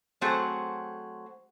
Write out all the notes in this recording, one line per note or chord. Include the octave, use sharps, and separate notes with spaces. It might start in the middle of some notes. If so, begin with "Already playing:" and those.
F#3 A3 C4 F#4 G#4 C5